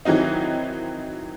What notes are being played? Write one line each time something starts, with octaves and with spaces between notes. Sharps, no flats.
D#3 E3 F#3 C4 D#4